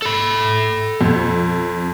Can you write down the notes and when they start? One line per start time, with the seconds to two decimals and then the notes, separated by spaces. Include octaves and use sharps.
0.02 A4 B5
1.01 F2